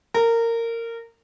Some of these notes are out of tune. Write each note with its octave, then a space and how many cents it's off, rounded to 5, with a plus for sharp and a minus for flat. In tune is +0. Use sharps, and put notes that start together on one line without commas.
A#4 -20